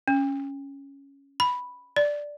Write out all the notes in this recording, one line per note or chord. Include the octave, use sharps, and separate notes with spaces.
C#4
B5
D5